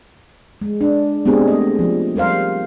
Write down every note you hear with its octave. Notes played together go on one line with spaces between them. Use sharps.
G#3
D4
G#3 B3 C4 D4 G4 G#4
A3 D#5
F3
G3 A#4 C5 F5